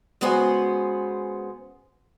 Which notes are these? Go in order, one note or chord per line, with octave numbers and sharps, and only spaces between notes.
C#3 G#3 B3 F#4 C5 G#5